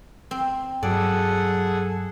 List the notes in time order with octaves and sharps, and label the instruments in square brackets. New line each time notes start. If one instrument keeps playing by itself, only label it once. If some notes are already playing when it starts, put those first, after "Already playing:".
[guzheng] C4
[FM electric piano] G2 F#3 [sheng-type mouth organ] G#4 A4 F#5 [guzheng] D5